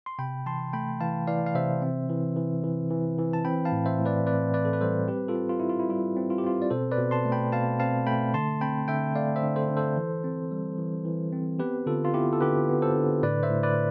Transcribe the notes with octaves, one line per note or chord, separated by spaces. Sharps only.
C6
C3 G5 B5
E3 A5 C6
A3 G5 B5
E3 F5 A5
E3 D5 F5
F5
C3 C5 E5
C4
E3
E3
E3
E3
E3
A5
C4 G5 B5
F5 A5
A2
C5 E5
A2
B4 D5
C4 B4 D5
C4 B4 D5
A4
B4
G3 A4 C5
C4 G4 B4
F4 A4
C4
F4
C4 E4
F4
E4
G3 F4
C4
F4
G4
C4 F4
D5
B2 A4 C5
B4 D5
B2
A5 C6
A3
G5 B5
B2 F5 A5
C4 F5 A5
A3 G5 B5
D3 A5 C6
C4 G5 B5
D3 E5 G5
A3 D5 F5
C5 E5
D3
A4 C5
D3
A4 C5
E3
C4
G3
E3
E3
C4
B3 G4 B4
D3 F4 A4
F4
B3 E4 G4
A4
D3 G4 B4
B3
A4 C5
D3
A2 B4 D5
C5 E5
A2
B4 D5